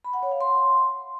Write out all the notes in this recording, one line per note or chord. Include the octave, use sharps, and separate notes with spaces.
B5
F#5
C#5
F5
C6